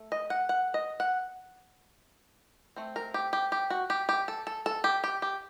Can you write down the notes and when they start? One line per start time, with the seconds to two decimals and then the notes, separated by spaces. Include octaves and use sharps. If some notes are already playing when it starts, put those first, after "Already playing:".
Already playing: A3
0.12 D#5
0.30 F#5
0.49 F#5
0.74 D#5
1.00 F#5
2.76 A3 C4
2.96 A#4
3.14 G4
3.33 G4
3.52 G4
3.70 F#4
3.90 G4
4.09 G4
4.28 A4
4.47 A4
4.66 A4
4.84 G4
5.04 G4
5.22 G4